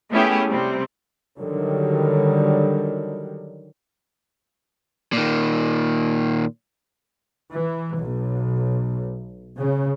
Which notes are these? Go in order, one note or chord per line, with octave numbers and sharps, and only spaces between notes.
A3 B3 C#4 E4 G4 G#4
C3 G3 C4
D3 D#3 F#3 G3
A#2 D#3
E3
B1
C#3